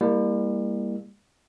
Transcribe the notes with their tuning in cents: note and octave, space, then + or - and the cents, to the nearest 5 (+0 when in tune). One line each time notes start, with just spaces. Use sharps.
G3 +35 A#3 +0 E4 +0